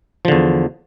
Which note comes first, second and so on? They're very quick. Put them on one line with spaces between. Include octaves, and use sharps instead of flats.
F3 D3 E2